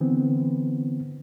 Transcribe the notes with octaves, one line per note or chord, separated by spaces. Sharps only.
D3 E3 B3 C4